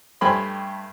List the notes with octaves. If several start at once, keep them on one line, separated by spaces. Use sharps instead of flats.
G2 A3 G4 G#5 B5 C6